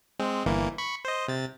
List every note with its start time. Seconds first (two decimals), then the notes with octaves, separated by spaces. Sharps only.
0.19 G#3 C4
0.46 G1 E3 A#3
0.78 B5 C#6
1.05 C5 D#5
1.28 C3 A6